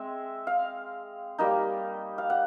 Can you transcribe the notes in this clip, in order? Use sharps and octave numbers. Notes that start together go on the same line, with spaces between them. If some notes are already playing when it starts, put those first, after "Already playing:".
Already playing: G#3 C4 E5
F5
G3 A#3 D#4
F5
F#5